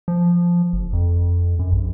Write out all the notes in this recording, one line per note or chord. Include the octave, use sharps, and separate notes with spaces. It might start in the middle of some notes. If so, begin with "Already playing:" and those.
F3
F#1
F2
F#2
A#1